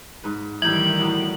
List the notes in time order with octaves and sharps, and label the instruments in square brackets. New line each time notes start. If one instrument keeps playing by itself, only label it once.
[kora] G#2 B4
[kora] A2 A#4 E5 [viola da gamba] D#3 G3 [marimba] E3 G6 [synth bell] F#7
[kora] A2 F#3 B3